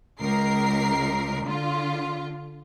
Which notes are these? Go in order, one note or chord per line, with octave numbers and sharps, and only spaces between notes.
C#2 A#4 C7
D3 F4